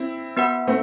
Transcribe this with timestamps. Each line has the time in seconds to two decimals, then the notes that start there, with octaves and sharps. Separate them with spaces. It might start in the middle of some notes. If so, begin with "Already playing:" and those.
Already playing: C4 E4
0.37 B3 F#4 B4 F#5
0.67 A3 C4